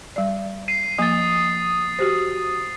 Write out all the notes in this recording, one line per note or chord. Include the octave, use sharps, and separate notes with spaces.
G3 D5
C7 D#7
F3 A#3 D#6 A6
F#4 G4 C5